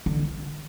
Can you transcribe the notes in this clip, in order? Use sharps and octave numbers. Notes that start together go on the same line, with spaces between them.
D3